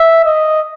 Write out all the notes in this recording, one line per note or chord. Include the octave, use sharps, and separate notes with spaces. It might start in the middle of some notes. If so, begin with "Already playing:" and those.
Already playing: E5
D#5